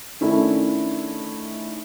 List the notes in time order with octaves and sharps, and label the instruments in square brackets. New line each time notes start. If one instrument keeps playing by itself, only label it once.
[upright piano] D#3 A3 C#4 D4 E4